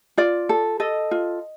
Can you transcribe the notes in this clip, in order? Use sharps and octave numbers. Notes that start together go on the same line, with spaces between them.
F4 D5
A4
A4 D#5
F4